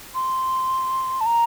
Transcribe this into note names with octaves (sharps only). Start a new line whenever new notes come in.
C6
A5
A#5